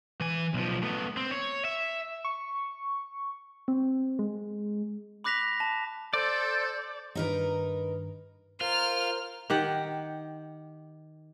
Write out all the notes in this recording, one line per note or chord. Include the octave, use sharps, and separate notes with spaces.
E3 G#5
B1 F3
A3 B3
C4
C#5
E5
C#6
C4
G#3
B5 D6 F#6 A#6 B6 F7
A5
A4 C5 D5 G6
G2 D#3 D#4 A#4 B4
F4 A#4 C5 F6
D#3 G4 F#5